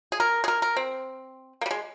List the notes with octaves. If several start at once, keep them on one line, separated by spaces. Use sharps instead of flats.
G#4
A#4
G#4
A#4
A#4
C4
A#3
G3
G#3